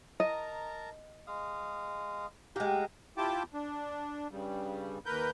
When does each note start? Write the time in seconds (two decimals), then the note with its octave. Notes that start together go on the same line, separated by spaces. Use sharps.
0.20 A#4 D#5 A5 A#5
1.27 G#3 F5 D#6
2.56 G#3 G4 F5 F#5 A#5
3.17 E4 F4 G4 G5 A5 D6
3.54 D4
4.31 G2 C#3 G3
5.06 D#2 A#4 B4 G6